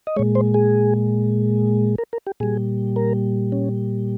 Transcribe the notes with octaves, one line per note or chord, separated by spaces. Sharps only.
D#5
A#2 G#3 C#5
C5
G#4
A#4
A#4
G4
A#2 G3 G#4
A#4
C#4